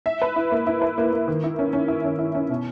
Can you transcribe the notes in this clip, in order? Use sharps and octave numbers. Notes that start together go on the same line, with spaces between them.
E5
B4
E4
A#3
E4
B4
A#3
A#3
D#3
E4
C#4
C#4
E4
C#4
E4
C#4
B2